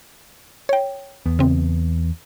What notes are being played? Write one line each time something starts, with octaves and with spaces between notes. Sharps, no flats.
C#5 G5
E2 B3
C#3 C4